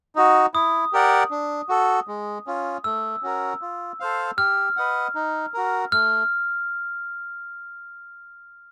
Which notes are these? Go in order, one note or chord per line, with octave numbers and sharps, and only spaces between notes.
D#4 F#4
E4 D#6
G4 A#4 D5 F#5
D4
F#4 A4
G#3
C#4 F4
A3 E6
C#4 F#4 A#4
F4
A4 C5 F5
G4 F6
B4 D#5 F#5
D#4
F#4 A#4
A3 F6